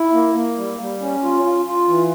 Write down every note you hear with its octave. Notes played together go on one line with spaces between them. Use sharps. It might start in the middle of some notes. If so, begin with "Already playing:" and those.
Already playing: E4
A#3
A#3
G3
G3
C#4
F4
F4
F4
E3